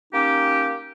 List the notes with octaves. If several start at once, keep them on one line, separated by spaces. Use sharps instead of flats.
A#3 C#4 D#4 G4